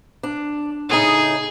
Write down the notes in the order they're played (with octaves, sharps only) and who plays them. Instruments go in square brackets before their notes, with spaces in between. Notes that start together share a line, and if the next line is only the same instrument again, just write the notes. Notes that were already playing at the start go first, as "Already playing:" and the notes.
[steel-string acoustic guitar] D4
[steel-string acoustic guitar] A2 C#3 D#4 [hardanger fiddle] G#4